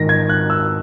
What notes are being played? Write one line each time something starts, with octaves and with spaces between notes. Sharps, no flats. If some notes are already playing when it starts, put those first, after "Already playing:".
Already playing: G#2 D#3 A#6
G#6
F#6
E6